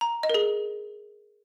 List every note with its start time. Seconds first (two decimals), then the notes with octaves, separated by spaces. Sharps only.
0.01 A#5
0.23 D#5
0.30 A#4
0.34 G#4